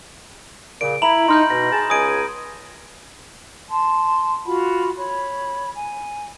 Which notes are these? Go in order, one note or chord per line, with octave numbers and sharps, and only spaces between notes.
A#2 C#3 D7
E4 A#5 B5 F#7
D#4 C6 F6 G6
B2 A#6
G#4 A5
C#2 G#5 D#6 D7
A5 C6
F4 F#4 F#5 B5
C#5 B5
G#5